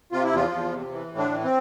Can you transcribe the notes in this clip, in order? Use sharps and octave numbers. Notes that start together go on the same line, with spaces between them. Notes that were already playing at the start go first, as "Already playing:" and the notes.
C3 F4
E4
E2 F3 F4
E2
C3
E3
A2
D3 D4
E3
C4